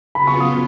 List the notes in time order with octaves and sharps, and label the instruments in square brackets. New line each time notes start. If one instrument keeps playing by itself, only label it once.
[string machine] C#3 F#3 B3 F4 [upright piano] B5
[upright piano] C#6
D#6